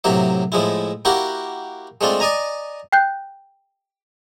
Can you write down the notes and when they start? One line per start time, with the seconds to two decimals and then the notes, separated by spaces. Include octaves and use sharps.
0.04 A2 C3 F#3 A#3 E5
0.52 A2 F3 G#3 E4
1.05 A#3 E4 F#4 G4 A#4 F#5
2.01 G#3 A3 C4 D4 F4
2.20 D5 D#5 G#5 A#5
2.92 G5 F#6 G6